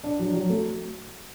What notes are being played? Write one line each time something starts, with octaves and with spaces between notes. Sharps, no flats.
D4
F#3
F#3
A3